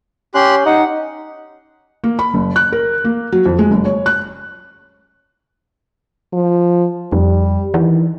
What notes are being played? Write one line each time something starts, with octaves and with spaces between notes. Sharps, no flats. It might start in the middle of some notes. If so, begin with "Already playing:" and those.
C#4 G4 C6 F#6
D#4 F#5
A#3
B5
F#1
F#6
A#4
A#3
F#3
F2
G#3
F#1
C#5
F#6
F3
F2 G3
D#3 E3